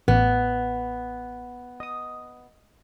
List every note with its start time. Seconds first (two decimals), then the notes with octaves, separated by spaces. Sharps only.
0.08 A1 B3
1.80 D#5 D#6